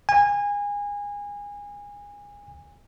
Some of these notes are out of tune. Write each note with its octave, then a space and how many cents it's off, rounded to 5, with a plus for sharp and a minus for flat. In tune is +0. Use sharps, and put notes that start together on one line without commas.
G#5 -25